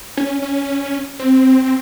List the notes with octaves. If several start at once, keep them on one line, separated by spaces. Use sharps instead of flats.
C#4
C#4
C4